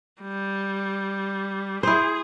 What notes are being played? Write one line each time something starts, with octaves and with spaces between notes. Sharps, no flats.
G3
E4 G#4 C5